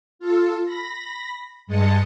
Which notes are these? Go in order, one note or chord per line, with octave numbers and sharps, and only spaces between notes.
F4 A4
B5 A#6
G2 G#3 D#5 A5 C#7